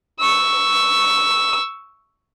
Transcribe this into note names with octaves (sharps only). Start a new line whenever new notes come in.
C#6 E6